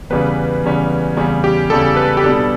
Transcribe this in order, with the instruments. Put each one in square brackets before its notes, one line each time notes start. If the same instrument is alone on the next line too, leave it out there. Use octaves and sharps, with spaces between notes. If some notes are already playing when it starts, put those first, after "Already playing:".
[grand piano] E2 C#3 G3 C#4 [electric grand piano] B4
[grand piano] E2 C#3 G3 C#4
E2 C#3 G3 C#4
[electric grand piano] G4
[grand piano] E2 C#3 G3 C#4 [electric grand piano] A4
[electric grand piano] B4
G4
[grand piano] B2 G3 B3 D4 [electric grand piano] A4